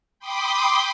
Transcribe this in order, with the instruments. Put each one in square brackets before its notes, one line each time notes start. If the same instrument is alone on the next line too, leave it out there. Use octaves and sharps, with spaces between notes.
[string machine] G5 B5 C6 D6 D#6 G6